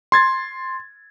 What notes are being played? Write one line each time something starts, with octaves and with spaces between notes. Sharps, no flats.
C6 G#6 A6